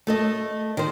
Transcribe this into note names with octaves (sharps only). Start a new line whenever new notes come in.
A3 A4 D#5
D#3 C5